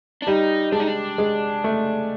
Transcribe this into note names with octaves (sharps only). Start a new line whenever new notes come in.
D4
G3 D#4
G#3 D4
D#4
D4
G#3
A3